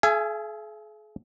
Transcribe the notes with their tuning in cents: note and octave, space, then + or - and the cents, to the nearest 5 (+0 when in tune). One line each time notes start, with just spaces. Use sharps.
G#4 +45 E5 +45 G#5 +0